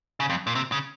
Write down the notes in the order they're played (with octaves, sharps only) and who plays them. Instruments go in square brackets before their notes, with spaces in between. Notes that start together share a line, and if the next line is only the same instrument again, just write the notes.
[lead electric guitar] C#3
F2
A#2
C3
C#3